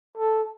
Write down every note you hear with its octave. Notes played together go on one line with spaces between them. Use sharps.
A4